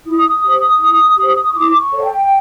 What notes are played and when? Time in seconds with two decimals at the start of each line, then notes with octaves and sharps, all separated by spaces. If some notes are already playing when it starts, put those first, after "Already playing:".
0.06 E4 D#6
0.43 G4 C5
0.80 E4
1.17 G4 C5
1.45 C#6
1.54 E4 D6
1.78 C#6
1.91 A4 C#5
2.03 G5